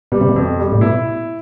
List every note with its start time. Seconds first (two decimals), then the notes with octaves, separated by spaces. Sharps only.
0.12 B2 G3
0.21 C3
0.29 B2
0.36 F2
0.59 G3
0.72 A2
0.81 B2 E4